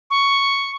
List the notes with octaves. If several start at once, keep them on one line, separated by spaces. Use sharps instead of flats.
C#6